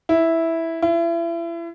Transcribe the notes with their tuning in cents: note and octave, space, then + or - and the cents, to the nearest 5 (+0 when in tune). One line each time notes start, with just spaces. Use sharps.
E4 -5
E4 +35